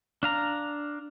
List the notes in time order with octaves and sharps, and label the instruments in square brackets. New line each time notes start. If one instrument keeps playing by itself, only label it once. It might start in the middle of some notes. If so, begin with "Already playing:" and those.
[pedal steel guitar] D4 F5 A#5